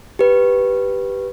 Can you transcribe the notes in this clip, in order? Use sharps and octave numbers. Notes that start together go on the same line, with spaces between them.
G4 B4